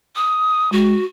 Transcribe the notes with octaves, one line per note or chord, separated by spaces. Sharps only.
D#6
G#3 F#4